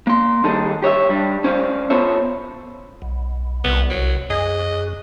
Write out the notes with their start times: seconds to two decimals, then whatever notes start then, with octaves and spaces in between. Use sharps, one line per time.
0.07 A#3 C6
0.44 D#3 G3 D#4 G#4 A4
0.82 G4 C#5 D#5 E5
1.09 G2 G3
1.44 C#4 C5 D5 F5
1.90 B3 F4 A4 C5 C#5 E5
3.02 B1
3.64 C2 B3
3.90 F#3
4.30 F#2 G#4 D#5